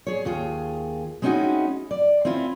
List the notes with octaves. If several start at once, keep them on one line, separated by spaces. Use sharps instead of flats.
G#4 C#5
D#2 F4 G#4
G#3 C4 C#4 D#4 E4 F#4
D5
C4 C#4 E4 F4